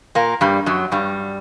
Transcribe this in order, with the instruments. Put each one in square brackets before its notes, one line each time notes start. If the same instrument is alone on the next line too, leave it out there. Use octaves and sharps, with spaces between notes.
[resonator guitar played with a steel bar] A#2 A#3
G2 G3
F#2 F#3
G2 G3